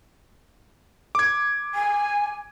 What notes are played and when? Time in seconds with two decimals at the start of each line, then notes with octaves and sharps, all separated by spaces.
1.15 D6 G#6
1.75 G#5